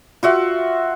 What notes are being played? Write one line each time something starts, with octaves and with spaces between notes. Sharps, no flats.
F4 F#4 E5